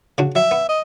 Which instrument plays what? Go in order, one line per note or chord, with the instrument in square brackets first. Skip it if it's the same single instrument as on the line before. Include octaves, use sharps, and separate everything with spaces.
[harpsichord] C#3 D4 F#4
[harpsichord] F#3 [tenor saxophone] E5
[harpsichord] B3
[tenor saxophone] D#5